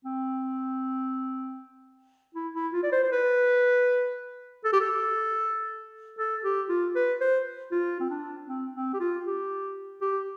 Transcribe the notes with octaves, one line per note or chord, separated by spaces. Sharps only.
C4
E4
E4
F4
D5
C5
C5
B4
A4
G4
A4
A4
G4
F4
B4
C5
F4
C4
D4
C4
C4
G4
F4
G4
G4